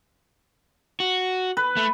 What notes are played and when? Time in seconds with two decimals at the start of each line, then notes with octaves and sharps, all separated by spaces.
1.00 F#4
1.57 B4
1.77 A3